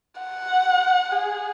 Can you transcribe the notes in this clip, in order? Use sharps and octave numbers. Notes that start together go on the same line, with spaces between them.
F#5
G#4